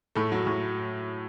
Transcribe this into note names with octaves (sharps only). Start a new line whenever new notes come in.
A2 A3
F#3
A2